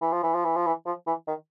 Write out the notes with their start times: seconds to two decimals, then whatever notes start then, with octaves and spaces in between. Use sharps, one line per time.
0.01 E3
0.13 F3
0.23 E3
0.35 F3
0.45 E3
0.56 F3
0.67 E3
0.86 F3
1.07 E3
1.27 D#3